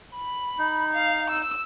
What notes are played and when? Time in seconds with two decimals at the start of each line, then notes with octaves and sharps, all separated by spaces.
0.16 B5
0.59 D#4
0.94 F5
1.30 E6